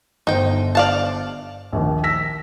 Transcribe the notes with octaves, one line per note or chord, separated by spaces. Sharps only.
G1 D#4 C5 G5
D5 F5 A5
A#1 D#2 D#3
E6 A#6 B6